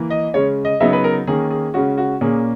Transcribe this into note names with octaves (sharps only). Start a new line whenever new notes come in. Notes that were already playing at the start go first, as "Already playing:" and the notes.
Already playing: E3 A#3
D#5
C#3 G#3 C#4 C#5
D#5
C#3 F#3 B3 D#4 E5
B4
A#4
D#3 A#3 C#4 G#4
G#4
C#3 G#3 C#4 F#4
F#4
A#2 A#3 C#4 G#4